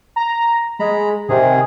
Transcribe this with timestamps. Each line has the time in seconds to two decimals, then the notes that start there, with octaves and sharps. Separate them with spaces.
0.16 A#5
0.79 G#3 A#5 B5
1.29 C3 D#3 G#4